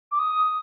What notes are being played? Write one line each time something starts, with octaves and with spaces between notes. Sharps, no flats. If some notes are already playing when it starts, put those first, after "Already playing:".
D6
D#6